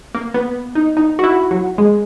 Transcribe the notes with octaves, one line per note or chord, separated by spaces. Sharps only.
A#3
B3
D#4
D#4
F#4
E4
F#3
G#3